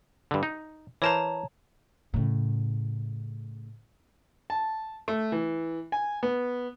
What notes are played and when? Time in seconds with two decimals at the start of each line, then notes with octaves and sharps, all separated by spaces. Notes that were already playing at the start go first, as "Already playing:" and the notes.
0.31 G2 D3
0.43 D#4
1.02 E3 A#4 C5 C#5 A5 A#5
2.14 A2 C#3
4.50 A5
5.08 A3
5.32 E3
5.92 G#5
6.23 B3